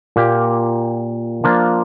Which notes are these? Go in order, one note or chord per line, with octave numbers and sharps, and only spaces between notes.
A#2 A#3 G4
F3 A#3 D4 F4